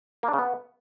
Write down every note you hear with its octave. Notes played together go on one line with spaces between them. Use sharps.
A#3
D4
C#3
B3